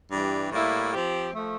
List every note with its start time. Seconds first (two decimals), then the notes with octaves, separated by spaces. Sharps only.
0.12 G2 E3 G3
0.52 A2 G3 A#3 E4
0.93 F3 C4 G4
1.34 F3 A3